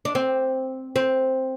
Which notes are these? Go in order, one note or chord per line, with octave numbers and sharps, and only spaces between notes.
D4
C4
C4